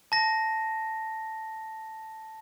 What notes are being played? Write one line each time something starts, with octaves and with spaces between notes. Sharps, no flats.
A5 A#6